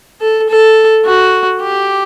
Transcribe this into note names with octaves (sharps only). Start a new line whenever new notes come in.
A4
A4
F#4
G4